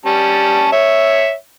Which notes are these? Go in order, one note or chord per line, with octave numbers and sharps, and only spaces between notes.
G3 C#4 A5
C#5 E5